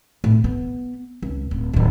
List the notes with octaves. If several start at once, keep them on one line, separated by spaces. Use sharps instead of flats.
A2
B3
C#2
D1
D1 D#3